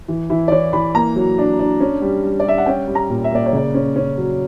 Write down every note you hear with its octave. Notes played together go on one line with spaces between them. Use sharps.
E3
E3 E4
D5
E3 C#5
E3 B5
A#3 A#5
F#3
D4
D4
C#4
G3
G3
D5
G3 E5
F#5
C#4 G5
G3
A#5
A#2
E5
A#3 D5
C#5
C#3 D5
C#4
C#4
F#3